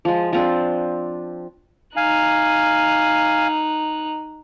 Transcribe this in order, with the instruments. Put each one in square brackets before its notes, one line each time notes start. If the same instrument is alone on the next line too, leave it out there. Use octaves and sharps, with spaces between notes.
[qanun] F3 G#3
F3 C4 D4
[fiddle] D#4 F#6 [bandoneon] F5 G#5